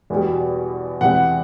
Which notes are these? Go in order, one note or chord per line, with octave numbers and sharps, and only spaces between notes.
E2 B2 G3
E2 C3 E3 F#5